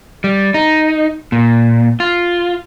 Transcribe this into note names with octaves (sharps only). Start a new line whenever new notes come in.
G3
D#4
A#2
F4